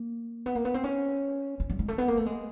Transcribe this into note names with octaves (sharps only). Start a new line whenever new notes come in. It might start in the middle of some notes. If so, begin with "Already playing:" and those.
Already playing: A#3
B3
A#3
B3
C4
C#4
C#4
G3
G#3
A3
B3
A#3
A3
G#3